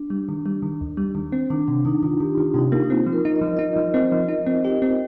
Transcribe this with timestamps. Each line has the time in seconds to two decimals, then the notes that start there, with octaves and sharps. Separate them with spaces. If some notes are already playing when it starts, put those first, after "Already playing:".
Already playing: D4
0.10 G3
0.29 D#3
0.46 G3
0.62 D#3
0.81 D#2
0.97 G3
1.15 D#3
1.32 C4
1.50 D#3 D4
1.68 C3 D4
1.85 D#3 D#4
2.03 D#3 F4
2.20 D#3 G4
2.37 D#3 F4
2.54 C3 D#4
2.72 A#3 D#4
2.84 D#4
2.90 C4 F4
3.06 F3
3.12 A#4
3.25 D#4
3.36 D#5
3.41 F3
3.57 D#4 D#5
3.76 F3
3.94 C4
4.12 F3
4.28 D#4
4.46 C4
4.65 G4
4.82 C4